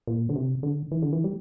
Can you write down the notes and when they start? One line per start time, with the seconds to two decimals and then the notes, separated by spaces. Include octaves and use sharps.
0.07 A#2
0.29 D3
0.36 C3
0.63 D3
0.91 E3
1.02 D3
1.13 E3
1.24 G3